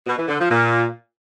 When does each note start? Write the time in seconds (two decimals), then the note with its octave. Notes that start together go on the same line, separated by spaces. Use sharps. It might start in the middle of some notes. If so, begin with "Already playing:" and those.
0.07 B2
0.17 E3
0.28 D3
0.39 F3
0.50 A#2